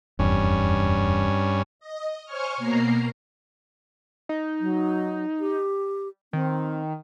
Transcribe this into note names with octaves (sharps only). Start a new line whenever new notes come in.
F1 E2 G2 C#4
D#5
C5 C#5 G#5 C#6 F6
B2 A#3 A#5 C7
D#4
F#3
G4
D#3 C4